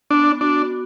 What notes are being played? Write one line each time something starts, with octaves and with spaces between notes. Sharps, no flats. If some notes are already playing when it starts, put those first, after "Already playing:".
B3 D4
D4 F#4